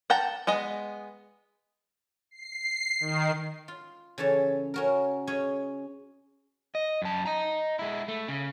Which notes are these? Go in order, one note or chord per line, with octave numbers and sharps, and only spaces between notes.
F#5 G5 A5 A#5
G#3 B3 D#5
C7
D#3
F4
C#3 E3 A4 C#5 A5
C#4 F#4 A#4
C#4 G#4 C#5 D#5
D#5
F#2 A5
D#5 A#5
G#3 E4
A3
C#3